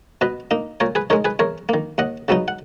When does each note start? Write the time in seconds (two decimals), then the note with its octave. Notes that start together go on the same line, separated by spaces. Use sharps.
0.21 B2 B4 D#5
0.51 A#3 D#4
0.80 A#2 A#4 C#5
0.95 G#4 B4
1.10 G#3 D#4 A#4 C#5
1.25 G#4 B4
1.39 E2 A#4 C#5
1.69 D#3 A#3
1.98 D#2 D#5 F#5
2.28 C#3 F#3 B3 D#4
2.48 F#5